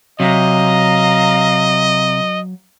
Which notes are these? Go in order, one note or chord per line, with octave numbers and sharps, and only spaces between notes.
C3 F#3 D#5 F5 A#5